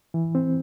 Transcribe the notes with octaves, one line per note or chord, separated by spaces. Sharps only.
E3
C4